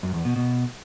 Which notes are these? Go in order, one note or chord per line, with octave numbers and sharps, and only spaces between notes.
F#2
E2
B2
B2